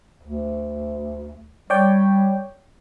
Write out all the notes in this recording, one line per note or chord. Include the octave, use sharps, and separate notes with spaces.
D2
G3 C#5 D5 G5